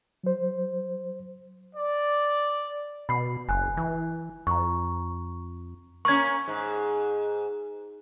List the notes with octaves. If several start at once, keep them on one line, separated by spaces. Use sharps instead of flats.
F#3 C5
D5
B2 B5 C7
F#1 G#5 F#6
E3
F2 A#5 C#6
A#3 C#4 C#6 G#6
G#2